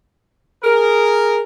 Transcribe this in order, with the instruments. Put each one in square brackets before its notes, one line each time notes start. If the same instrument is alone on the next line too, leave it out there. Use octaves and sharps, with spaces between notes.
[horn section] G#4 A#4